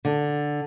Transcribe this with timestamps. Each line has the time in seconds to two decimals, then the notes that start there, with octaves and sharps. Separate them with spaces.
0.05 D3